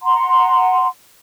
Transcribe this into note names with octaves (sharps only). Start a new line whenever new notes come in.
F#5 A#5 C6